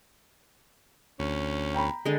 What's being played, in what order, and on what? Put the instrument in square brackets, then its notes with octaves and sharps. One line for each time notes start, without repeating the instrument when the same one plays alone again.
[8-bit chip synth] D2 [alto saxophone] C#4
[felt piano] G5 A#5 B5
[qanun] D3 G#3